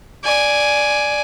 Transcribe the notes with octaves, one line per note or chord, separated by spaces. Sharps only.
D5 G#5